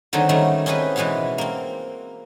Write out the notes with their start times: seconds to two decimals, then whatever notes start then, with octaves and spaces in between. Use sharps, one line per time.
0.13 D3 D#3 F#3 C4 D#4 G#4
0.29 D#3 G3 A3 C#4 A#5
0.66 C4 C#4 D#4 E4 G#4 B4
0.96 B2 E3 G#3 E4 F#4 F5
1.38 A#3 C4